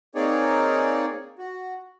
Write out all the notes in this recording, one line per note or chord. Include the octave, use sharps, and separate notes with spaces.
A#3 C4 D#4 G#4 C#5 D5
F#4